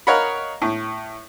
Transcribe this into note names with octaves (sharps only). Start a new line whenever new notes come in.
A#4 C#5 D#5 F5 F#5 B5
A2